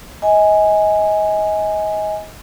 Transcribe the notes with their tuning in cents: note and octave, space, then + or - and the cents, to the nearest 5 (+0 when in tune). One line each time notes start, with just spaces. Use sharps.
D#5 +30 G#5 +0